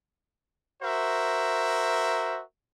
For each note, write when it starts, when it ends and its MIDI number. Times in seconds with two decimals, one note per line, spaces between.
0.82 2.42 66
0.82 2.42 70
0.82 2.42 72
0.82 2.42 76